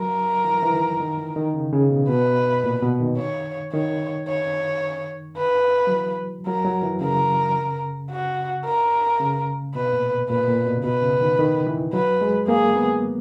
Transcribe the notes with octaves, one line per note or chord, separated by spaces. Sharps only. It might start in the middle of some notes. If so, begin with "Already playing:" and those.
Already playing: F#3 A#4
E3
E3
D#3
D#3
E3
D#3
C#3
C#3
B2
B2 B4
A#2
B2
D#3
C#5
D#3 C#5
C#5
B4
F#3
E3
F#3 A#4
F#3
E3
C#3 A#4
F#4
A#4
C#3
B2 B4
A#2
B2
A#2 B4
A#2
B2
C#3
B2 B4
C#3
D#3
D#3
E3
F#3 B4
G#3
A#3 G#4
B3